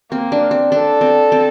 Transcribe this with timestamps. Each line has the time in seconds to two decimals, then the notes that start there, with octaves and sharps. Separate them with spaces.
0.12 A#3 C4
0.32 D4
0.51 C4
0.72 D4 A4
1.01 C4
1.32 C4